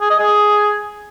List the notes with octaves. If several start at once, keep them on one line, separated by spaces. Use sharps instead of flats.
G#4
D#5
G#4